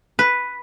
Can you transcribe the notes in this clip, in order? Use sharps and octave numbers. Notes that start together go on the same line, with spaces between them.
B4